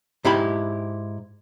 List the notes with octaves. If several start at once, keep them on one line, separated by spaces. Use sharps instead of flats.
G#2 E4 G4 B5